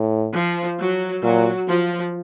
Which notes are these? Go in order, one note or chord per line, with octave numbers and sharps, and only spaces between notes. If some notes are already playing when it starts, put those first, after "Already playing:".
Already playing: A2
F3
F#3
A#2 F#3
F3